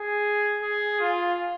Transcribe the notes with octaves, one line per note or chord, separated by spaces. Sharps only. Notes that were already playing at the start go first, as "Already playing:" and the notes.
Already playing: G#4
G#4
F4